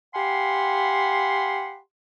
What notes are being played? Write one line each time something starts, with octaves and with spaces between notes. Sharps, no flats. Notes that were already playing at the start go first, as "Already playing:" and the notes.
G4 F5 F#5 G#5 B5 C6